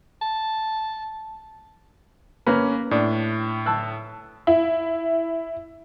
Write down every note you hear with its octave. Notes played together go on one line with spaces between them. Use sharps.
A5
A#3 C#4 B4
A2 D4
A5 E6 F#6
E4